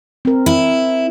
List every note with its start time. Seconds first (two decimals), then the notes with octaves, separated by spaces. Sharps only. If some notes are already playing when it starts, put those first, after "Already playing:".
0.25 C4 A#4
0.46 E4